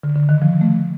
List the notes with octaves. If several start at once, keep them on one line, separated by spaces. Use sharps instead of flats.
D3
D3
D#3
F3
A3